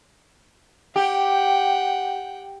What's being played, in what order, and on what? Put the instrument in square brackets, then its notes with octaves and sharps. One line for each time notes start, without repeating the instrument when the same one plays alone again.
[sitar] G4 [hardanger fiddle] F#5 G5